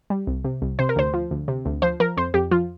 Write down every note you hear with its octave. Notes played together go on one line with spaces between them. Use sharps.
G3
C2
C3
C2
C3 C5
A#4
D2 C5
F3
D2
C3
D2
F3 C5
F3 A#4
F2 C5
F2 G4
F3 F4